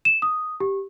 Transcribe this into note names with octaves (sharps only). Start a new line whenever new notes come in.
E7
D#6
G4